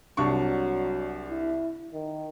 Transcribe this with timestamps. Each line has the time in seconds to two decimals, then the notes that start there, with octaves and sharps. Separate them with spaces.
0.17 C2 F#3 D4 C#6
1.30 E4
1.94 D#3